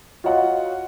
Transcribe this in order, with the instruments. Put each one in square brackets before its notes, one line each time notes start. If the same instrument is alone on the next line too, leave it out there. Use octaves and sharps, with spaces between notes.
[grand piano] F4 F#4 C#5 D#5 F#5